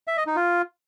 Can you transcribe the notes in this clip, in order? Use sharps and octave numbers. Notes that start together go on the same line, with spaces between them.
E5
D#5
D#4
F4